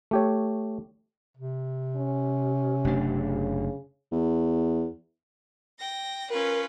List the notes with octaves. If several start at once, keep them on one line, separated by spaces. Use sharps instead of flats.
A3 G4 C#5
C3
C#4
F#1 A3 D4
C#3
E2
G5 A#6
C#4 F4 A#4 B4